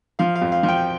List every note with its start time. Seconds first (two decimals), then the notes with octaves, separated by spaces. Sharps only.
0.19 F3 F5
0.35 F5
0.42 F2
0.52 F5
0.63 F3
0.68 G5